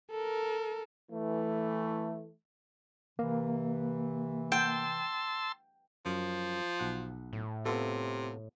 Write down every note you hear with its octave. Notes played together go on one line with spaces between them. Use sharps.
A4 A#4
E3 A3
C3 E3 A#3
G5 A5 C6 E6
F#2 F3
B1 F#5
A2
C3 B3 F4 A4